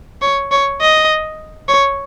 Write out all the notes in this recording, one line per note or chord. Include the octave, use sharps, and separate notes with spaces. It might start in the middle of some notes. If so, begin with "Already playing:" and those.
C#5
C#5
D#5
C#5